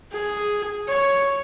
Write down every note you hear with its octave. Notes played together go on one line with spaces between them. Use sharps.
G#4
C#5